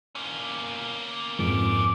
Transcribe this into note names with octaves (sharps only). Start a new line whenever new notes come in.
A#3 C#4
F2 G#2 D6